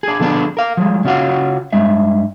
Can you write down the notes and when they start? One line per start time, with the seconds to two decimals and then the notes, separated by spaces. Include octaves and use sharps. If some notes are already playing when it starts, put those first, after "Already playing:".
0.03 D4 G#4
0.20 D3 F3 B3 D4 G#4
0.57 A#4 F5
0.77 F3 G3 G#3
1.05 C#3 C#4 F4 F#4 F5 F#5
1.73 G2 G#3 E5